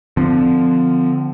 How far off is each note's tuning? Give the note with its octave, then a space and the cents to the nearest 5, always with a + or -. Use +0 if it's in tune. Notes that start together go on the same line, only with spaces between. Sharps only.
D3 +15 F3 +0 C4 -40